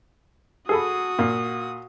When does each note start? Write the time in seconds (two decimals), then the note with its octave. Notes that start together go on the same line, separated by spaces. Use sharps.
0.69 F#4 G#4 A4 B5 D#6
1.19 A#2